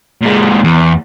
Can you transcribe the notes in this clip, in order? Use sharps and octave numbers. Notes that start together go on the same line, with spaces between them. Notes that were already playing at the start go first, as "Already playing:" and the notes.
A#2 G#3
E2